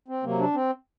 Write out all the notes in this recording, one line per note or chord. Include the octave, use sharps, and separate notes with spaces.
C4
C3 F#3 A#3
D4
C4